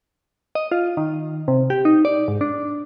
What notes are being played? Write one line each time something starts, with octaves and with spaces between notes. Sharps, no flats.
D#5
F4
D#3
C3
G4
D#4
D5
G#2
D4